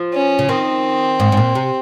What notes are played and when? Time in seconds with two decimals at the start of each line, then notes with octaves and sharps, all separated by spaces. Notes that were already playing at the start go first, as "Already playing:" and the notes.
Already playing: F3
0.14 C#4
0.39 C#3
0.49 D#3 C4
1.20 G#2
1.32 G#2
1.37 A#2
1.55 C3